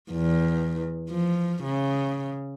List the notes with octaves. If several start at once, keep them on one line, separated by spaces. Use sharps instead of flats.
E2
F3
C#3